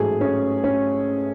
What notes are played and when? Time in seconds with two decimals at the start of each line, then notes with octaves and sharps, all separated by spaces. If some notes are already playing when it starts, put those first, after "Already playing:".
Already playing: A1 G#2 F#3 A3 G#4
0.21 C#4
0.64 C#4